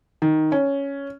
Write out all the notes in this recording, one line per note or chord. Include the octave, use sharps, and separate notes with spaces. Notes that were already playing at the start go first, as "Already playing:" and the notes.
D#3
C#4